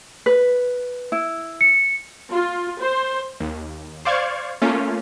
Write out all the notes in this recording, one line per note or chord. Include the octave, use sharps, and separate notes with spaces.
B4
E4
C#7
F4
C5
D#2
C5 D5 F5 C#6 G#6
A3 A#3 C#4 F4